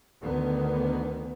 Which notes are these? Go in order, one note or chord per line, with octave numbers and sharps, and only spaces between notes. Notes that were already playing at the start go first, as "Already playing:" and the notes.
D2 D3 D#3 B3